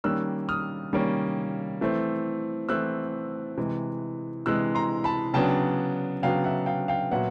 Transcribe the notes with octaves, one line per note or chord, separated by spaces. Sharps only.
D#3 G3 A#3 C#4 E6 F#6
D#6 F6
D#3 G3 A#3 C#4
E3 A3 C4
E3 A3 C4 E6 F#6
C3 E3 G#3
C3 E3 G#3 E6 F#6
A#5 C6
A5 B5
C#3 F#3 B3 D4 G5 A5
C#3 F#3 B3 D4 F5 G5
E5 F#5
F5 G5
F5 G5
A#2 F#3 B3 E5 F#5